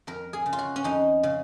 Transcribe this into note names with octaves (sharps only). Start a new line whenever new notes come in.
F2 A#4
G#4
C#3
F4
F#4
C#4
F2 D#4
C#3